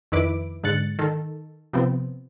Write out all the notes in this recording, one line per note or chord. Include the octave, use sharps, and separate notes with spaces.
F2 D#3 E4 B4 D6 D7
G#2 D3 F#6 A6 C#7
D#3 A4
C3 F3 B3 C4